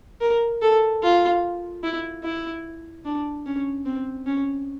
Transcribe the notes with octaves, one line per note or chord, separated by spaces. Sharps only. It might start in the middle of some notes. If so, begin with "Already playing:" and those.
A#4
A4
F4
E4
E4
D4
C#4
C4
C#4